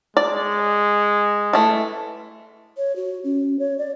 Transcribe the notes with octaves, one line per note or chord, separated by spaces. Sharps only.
G#3 D5
E3 A3
C#5
F#4
C#4
C#5
D5